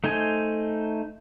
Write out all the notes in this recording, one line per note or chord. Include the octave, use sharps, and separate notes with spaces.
A3 D#4 C5 G#5